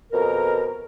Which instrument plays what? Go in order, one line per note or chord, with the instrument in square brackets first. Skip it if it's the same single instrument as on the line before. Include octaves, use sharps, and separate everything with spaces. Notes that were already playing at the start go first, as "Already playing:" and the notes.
[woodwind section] F2 B2 A#4